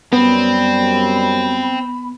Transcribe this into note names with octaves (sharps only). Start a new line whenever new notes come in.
F#2 G3 B3 C4 B5